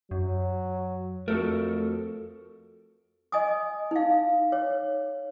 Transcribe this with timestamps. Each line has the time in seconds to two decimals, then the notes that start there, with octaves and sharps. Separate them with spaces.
0.11 F#2 F#3
1.28 F2 A3 F#4 A4 A#4
3.32 D#5 G#5 D#6
3.91 D#4 F5
4.52 C#5